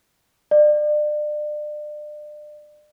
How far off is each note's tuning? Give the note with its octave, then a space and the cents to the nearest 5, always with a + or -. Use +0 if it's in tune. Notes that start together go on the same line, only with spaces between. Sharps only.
D5 +30